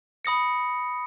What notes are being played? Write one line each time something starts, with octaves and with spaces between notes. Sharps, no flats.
B5 D#6 A#6 C#7